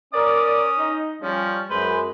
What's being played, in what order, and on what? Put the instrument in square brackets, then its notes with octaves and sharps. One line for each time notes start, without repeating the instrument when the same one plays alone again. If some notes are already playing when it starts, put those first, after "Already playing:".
[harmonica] C#4 D#6 [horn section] A#4 D5
[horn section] D#4
[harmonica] F3 [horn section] G3 C#4
[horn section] F#2 G#3 [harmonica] B4 C5